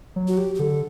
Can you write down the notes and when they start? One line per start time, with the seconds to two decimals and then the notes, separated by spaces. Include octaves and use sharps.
0.16 F#3
0.28 F#4
0.37 G4
0.55 G4
0.59 D3 A4